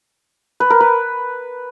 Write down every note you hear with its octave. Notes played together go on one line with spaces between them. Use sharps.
B4
A#4
B4